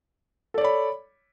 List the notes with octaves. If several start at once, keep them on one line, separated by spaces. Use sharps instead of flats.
A4 C#5 D5 B5